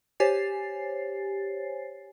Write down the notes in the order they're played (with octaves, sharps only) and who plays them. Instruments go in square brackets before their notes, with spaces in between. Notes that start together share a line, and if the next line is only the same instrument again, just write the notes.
[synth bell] G4 C5 C#5 G#5 A6 C7